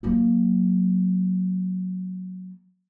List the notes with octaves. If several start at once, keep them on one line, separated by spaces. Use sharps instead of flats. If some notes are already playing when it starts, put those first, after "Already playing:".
F#3 A#3